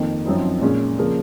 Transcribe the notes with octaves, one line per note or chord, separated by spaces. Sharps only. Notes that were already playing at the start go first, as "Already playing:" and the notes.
Already playing: F2 D#3 A#3
F#2 F3 C4 D#4
A#2 G#3 C#4
C#3 F3 A#3